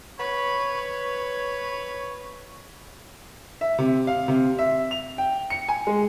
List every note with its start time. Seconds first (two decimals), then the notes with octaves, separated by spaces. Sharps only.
0.19 B4 C#5
3.61 E5
3.79 C3
4.07 F5
4.28 C3
4.59 E5
4.91 F7
5.18 G5
5.50 C#7
5.69 G#5
5.87 G#3